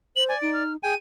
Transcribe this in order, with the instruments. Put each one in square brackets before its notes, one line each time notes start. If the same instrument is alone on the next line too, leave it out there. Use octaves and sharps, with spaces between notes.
[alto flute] C5 [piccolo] F#7
[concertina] D5 [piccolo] G#5
[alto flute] D#4 [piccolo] D7
[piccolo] F6
[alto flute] G#4 [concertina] G5 G#5 [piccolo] D#7